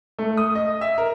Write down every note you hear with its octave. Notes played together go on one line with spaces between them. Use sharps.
A3
D#6
D#5
E5
A#4